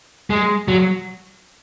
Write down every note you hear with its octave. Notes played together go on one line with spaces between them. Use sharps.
G#3
F#3